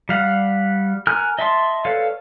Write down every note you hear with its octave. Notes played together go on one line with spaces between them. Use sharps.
G3 F5 F#5
A#4 G#5 F6 F#6
D#5 E5 A5 C6
A4 B4 C#5 D5 F5